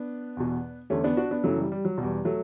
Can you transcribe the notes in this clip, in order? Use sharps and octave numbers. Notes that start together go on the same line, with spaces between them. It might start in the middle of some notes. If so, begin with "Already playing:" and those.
Already playing: B3 D4
E2 B2
E2 D3 A3 C#4
B3 D4
D4 F#4
B3 D4
F#2 C#3 E3 F#3 A3
G3
G3
F#3
E2 B2 G3
F#3 A3